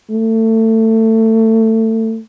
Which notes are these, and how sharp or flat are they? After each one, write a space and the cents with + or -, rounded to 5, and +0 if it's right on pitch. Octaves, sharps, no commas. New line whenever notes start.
A3 +25